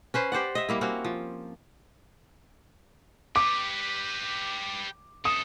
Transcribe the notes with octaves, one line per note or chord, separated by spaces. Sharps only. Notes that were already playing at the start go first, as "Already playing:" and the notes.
C#4 B4 C5
G4 C5 D5 F#5
D#5 E5
G3 A#3 E4
A#3 C4 C#4 F#4
F3
G4 B4 D6
F#2 A4 D#6